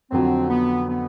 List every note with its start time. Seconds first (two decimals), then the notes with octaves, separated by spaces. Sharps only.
0.11 F2 D3 F#3 C4
0.50 B3
0.89 B3